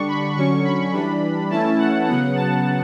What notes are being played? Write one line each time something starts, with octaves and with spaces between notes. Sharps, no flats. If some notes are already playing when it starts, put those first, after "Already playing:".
Already playing: D3 G3 D4 C#6
B5
D3 F#3 C#4 C#6
B5
E3 G3 D4
E3 A3 C#4 E4 A5
F#5
C#3 F#3 B3 F#5
A5